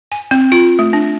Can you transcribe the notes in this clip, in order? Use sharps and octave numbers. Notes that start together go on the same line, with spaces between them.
G#5
C4
F4
A3
D4